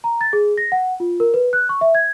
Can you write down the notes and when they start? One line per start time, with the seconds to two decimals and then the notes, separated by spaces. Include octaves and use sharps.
0.04 A#5
0.21 A6
0.33 G#4
0.58 A#6
0.72 F#5
1.00 F4
1.20 A#4
1.34 B4
1.53 F#6
1.69 C#6
1.81 E5
1.95 G#6